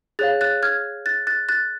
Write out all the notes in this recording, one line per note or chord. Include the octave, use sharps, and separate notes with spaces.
G#4 C#5 F5 F#6 A6
F#6 A6
F6 G#6
F#6 A6
F#6 A6
F#6 A6